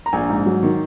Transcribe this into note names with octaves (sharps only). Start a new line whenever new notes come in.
A#5
A#1 G#5
G#2
F#3
D#3